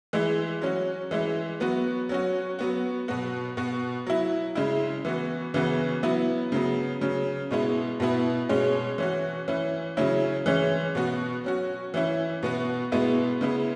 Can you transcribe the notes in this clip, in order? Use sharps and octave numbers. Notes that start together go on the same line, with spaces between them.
E3 G#3 E4
F#3 C#4 F#4
E3 G#3 E4
F#3 B3 F#4
F#3 C#4 F#4
F#3 B3 F#4
B2 F#3 B3 F#4
B2 B3 F#4
F#3 E4
C#3 G#3 E4
E3 B3 F#4
C#3 E3 B3 F#4
F#3 B3 E4
C#3 F#3 B3
C#3 F#3 C#4
B2 G#3 B3 E4
B2 B3 E4
B2 G#3 C#4
E3 C#4 F#4
E3 C#4 E4
C#3 F#3 C#4 E4
E3 G#3 C#4
B2 B3 F#4
F#3 C#4 F#4
E3 C#4 E4
B2 B3 F#4
B2 G#3 B3 E4
C#3 G#3 B3 E4